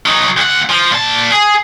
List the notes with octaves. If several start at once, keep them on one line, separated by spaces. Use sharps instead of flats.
F#3 D#4
D2 F#5
F3
A#2 A5
G#4